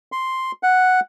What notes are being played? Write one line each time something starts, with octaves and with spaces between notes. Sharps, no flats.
C6
F#5